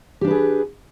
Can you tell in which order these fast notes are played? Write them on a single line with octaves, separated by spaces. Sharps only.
G4 D4 B4 G#4